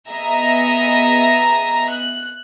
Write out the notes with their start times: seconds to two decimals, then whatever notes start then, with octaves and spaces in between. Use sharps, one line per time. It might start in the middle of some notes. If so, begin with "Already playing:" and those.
0.10 B3 G#4 D#5 E5 A#5
1.91 F#6